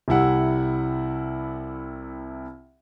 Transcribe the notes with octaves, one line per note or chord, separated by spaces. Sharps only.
C2 C3 E4 F#5